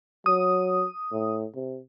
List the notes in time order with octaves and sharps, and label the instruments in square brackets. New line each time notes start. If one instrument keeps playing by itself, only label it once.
[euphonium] F#3 [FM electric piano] D#6
[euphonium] A2
C3